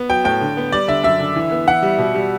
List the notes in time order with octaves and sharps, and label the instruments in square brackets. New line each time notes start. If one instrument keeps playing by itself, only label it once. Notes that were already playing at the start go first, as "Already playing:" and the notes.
Already playing: [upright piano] B3
[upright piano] F#3 [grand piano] G5
[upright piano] A2 [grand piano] G5
[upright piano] D3
B3
[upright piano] G3 [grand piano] D5
[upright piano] D3 [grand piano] E5
[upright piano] F#2 [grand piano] E5
[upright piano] D3
E3
B3
[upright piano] E3 [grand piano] F#5
[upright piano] G3
B2
G3